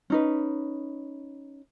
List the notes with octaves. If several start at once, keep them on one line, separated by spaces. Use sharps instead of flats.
C#4 D#4 B4